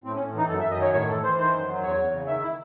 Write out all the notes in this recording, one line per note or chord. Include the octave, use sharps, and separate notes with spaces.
A2 C4
C#4
A2
E3 D#4
F#2 A4
E5
F#2
D#5
D#3 C#5
A2 C#5
E3 A4
E3 C5
D#3 C5
F#2
F#3
E2 C#5
E2
C#3
D#3 E5
E4